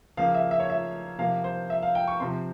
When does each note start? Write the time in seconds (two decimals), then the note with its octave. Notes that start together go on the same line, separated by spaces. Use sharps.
0.17 C#3 F3 A#3 F5
0.34 E5
0.51 E5
0.60 C#5
0.70 E5
1.18 C3 F3 A#3 F5
1.44 C5
1.70 E5
1.82 F5
1.95 G5
2.08 C#6
2.20 C3 F3 C4 C6